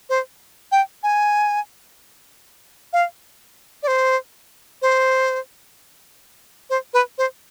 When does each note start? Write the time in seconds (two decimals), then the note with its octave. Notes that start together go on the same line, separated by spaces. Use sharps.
0.09 C5
0.72 G5
1.03 G#5
2.93 F5
3.83 D5
3.87 C5
4.82 C5
6.70 C5
6.93 B4
7.18 C5